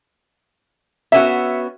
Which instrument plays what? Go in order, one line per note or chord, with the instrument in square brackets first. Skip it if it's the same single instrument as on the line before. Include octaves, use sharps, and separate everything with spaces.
[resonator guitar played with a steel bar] B3 C#4 F#4 [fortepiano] E5